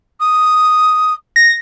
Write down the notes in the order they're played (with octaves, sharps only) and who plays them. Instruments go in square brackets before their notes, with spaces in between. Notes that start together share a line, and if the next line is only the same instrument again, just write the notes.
[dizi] D#6
[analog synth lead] A#6